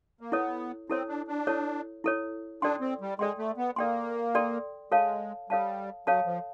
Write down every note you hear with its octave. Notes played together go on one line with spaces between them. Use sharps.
A#3
B3 E4 A4 C#5
C4 E4 A4 C#5
D4
D4
E4 A4 C#5
E4 A4 C#5
D4 A4 D5 G5 C6
C4
G3
G#3 A4 D5 G5 C6
A3
B3
A#3 A4 D5 G5 C6
A4 D5 G5 C6
G#3 A4 C#5 F5 A5
G3 A4 C#5 F5 A5
F#3 A4 C#5 F5 A5
F3